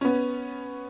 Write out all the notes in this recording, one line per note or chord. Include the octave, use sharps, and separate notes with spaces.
B3 C#4